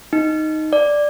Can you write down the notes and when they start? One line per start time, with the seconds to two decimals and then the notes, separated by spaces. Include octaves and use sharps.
0.13 D#4
0.73 D5